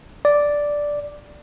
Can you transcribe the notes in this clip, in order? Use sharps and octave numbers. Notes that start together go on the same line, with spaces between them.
D5